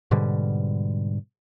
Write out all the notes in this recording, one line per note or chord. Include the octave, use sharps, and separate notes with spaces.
G#2 B2 D3 G3